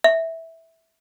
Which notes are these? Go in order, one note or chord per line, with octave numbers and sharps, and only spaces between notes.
E5